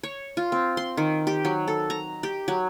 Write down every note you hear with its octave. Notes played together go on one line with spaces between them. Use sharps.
C#5
F4
C4
C6
D#3
G4
F#3
A4
A#5
G4
F#3